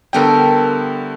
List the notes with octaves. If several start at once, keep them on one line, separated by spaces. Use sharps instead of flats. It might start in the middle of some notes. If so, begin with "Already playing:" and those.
D3 G3 A3 B3 A#4 G5